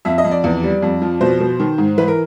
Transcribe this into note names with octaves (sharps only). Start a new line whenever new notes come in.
F2 E5
D#5
F2
D5
E2
G3
F2
F3
B2 C5
B2
D#3
G#2
E3 B4
A#4